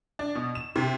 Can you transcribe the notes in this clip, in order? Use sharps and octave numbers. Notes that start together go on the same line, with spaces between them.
D4
B2
E7
C3